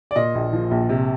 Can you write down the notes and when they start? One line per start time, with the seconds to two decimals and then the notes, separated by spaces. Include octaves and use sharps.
0.11 D5
0.16 A#2 D#5
0.35 A#1
0.53 F3
0.71 A#1
0.89 C3